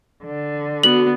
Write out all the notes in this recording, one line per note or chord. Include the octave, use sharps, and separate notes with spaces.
D3
B3 F#4 F#7